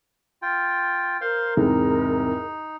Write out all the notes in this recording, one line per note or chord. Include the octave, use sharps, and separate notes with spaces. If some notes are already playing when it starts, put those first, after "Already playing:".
F4 G5
A#4 C5 F5 C6
E2 G#2 C3 D#4